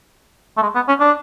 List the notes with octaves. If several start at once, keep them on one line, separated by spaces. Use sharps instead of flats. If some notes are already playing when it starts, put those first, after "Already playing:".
A3
G#3
B3
C#4
D4